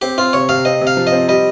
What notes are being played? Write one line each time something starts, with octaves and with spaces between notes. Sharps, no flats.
C4 G4
C4 F4
C3 C#5
C3 F5
C4 D#5
C3
F5
F3
D#5
C4
G3 D#5